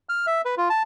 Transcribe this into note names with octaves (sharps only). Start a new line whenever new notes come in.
F6
E5
B4
F4
A5